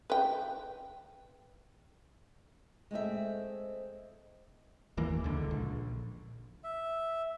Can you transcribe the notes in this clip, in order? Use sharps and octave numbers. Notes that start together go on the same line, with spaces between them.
B4 G5
G#3 A3 C4 E5
F#1 D#2 E3 A#3
C#2 D3
A#1
E5